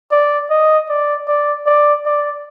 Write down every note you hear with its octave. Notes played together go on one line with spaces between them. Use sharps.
D5
D#5
D5
D5
D5
D5